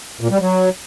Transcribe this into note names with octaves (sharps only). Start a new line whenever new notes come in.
A#2
G3
F#3